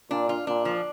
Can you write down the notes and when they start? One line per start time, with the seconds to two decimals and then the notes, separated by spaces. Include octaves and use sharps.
0.10 A#2 D4
0.29 F4
0.47 A#2 D4
0.65 F3